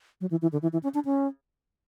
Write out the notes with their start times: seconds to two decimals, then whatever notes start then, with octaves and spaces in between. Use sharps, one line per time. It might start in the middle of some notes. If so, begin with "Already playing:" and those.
0.21 F#3
0.31 E3
0.42 E3
0.52 D3
0.62 E3
0.73 E3
0.83 C#4
0.94 D4
1.05 C#4